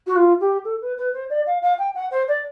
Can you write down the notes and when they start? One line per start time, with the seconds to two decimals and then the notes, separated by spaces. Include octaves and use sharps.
0.06 F#4
0.15 F4
0.40 G4
0.64 A4
0.81 B4
0.97 B4
1.13 C5
1.29 D5
1.46 F5
1.62 F5
1.78 G5
1.94 F#5
2.10 C5
2.28 D5